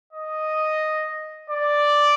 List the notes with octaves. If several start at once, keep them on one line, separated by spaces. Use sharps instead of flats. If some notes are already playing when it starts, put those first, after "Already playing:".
D#5
D5